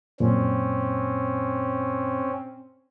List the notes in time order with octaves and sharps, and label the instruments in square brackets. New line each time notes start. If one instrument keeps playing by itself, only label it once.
[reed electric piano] F#2 A#2 [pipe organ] C4 C#4